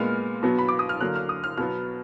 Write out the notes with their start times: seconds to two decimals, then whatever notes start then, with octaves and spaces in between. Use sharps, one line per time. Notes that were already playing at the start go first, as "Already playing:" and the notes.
Already playing: A#2 G#3 B3 F6
0.43 B2 F#3 B3
0.59 B5
0.69 D6
0.79 D#6
0.89 F6
1.00 D3 F#3 A#3 F#6
1.15 F6
1.29 D#6
1.44 F6
1.57 B2 F#3 B3 F6